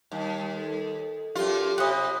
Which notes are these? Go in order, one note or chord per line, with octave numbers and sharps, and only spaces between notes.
D#2 G3 A5
A4
F#2 F4 G4
C3 C#5 D#5 F#5 B5